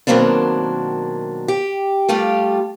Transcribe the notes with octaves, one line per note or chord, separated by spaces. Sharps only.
B2 D#3 F#3 A#3 C4 D4
G4
G3 A3 F4 G4